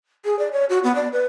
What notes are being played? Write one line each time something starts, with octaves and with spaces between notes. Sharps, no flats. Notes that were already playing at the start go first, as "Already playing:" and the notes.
G#4
D5
C#5
F#4
B3
D5
B4